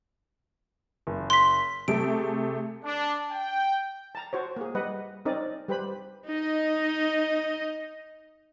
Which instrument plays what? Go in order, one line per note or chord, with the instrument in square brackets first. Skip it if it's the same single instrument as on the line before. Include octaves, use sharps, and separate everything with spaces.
[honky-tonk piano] F#1
[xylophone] C6 B6
[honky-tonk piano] C3 A3 G#4 [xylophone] D7
[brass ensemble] D4
G5
[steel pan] A5 A#5
F#4 C5 C#5
A#3 G#4
G3 B4 D#5 F#5
C4 C#4 D#4 A#4 D5 D#5
G3 G4 B4 C5 B5
[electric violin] D#4 D#5